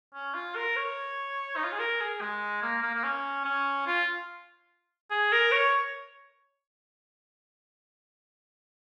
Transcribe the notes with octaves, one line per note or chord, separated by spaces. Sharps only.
C#4
F4
A#4
C#5
D#4
F4
G#4
A#4
G#4
G#3
A#3
A#3
A#3
C#4
C#4
F4
G#4
A#4
C#5